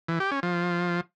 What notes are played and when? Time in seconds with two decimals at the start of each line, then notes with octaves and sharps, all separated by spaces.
0.08 E3
0.20 G4
0.32 C#4
0.43 F3